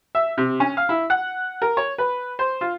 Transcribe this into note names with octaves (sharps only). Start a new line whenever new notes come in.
E5
C3
C#4
F5
E4
F#5
A#4
C#5
B4
C5
F4